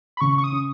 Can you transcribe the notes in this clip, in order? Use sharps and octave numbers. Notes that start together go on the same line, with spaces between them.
B5
C#3 C#6
C#6
D#6
C#4